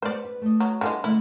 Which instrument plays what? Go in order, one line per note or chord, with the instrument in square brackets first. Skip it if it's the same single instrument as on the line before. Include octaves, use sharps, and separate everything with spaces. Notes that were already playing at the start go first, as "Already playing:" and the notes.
[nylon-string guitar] G#3 B3 [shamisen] C5 D5
[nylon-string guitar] B4
A3 D#5
[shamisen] F#3
[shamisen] D3 E3 G#3 [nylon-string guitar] G3 B3 D4
[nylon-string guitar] D3 G#3 A3 [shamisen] E4